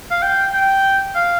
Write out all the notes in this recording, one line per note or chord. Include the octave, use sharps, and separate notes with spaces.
F5
G5
G5
F5